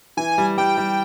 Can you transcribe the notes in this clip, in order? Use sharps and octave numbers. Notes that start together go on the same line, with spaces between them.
E3 G#5
G3
G3 G5
G3